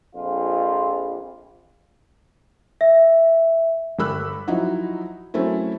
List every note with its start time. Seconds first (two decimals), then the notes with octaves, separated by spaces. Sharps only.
0.14 A#1 F2 F4
2.81 E5
3.99 G1 G3 B5 E6 F#6
4.48 F3 F#3 D#4 E4 F#4
5.34 F#3 A3 C4 C#4 E4